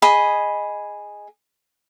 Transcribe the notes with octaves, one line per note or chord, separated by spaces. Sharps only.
G#4 D#5 B5